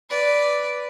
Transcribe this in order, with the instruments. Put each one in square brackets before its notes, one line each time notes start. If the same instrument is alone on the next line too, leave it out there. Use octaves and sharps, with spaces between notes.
[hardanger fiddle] B4 D5